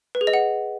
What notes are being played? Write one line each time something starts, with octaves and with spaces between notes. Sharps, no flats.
B4
G#4
D#5
F#5